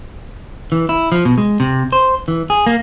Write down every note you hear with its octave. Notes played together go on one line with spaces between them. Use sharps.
E3
E4
F3
B2
G#3
C3
C5
E3
G#4
A#3